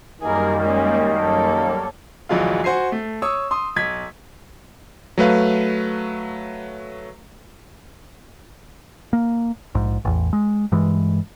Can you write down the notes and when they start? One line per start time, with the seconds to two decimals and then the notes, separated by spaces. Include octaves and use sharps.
0.21 F#2 D#3 G3 A#3 G#4 A#4
0.61 G#3 C#4
1.20 A4 C#5
2.29 D1 A#1 E3 F#3 G#3 F4
2.64 F#4 C5 G#5 C7
2.92 A3
3.22 C#5 C#6 D#6 E6
3.51 C6 D#6
3.76 B1 G#6 B6
5.18 F#3 A3 B4 F5
9.13 A#3
9.75 A#1 G#2
10.05 A1 E2
10.33 G#3
10.72 G2 E3 G#3